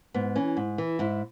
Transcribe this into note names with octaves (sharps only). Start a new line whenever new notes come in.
G#2 B3
E3 C#4
G#2
E3
G#2 E4